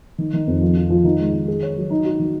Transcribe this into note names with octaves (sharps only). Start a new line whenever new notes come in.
D#3
D#3
F2
F3
F4
F3
D#3
G#3
D#3
G#4
C#5
F#3
D#4
F#4
D#3